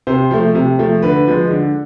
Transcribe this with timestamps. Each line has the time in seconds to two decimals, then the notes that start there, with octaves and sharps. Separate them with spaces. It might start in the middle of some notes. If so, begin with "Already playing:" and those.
0.07 C3 C5
0.31 F3 A3
0.55 C3
0.79 F3 A3
1.02 D3 B4
1.27 F3 G#3
1.51 D3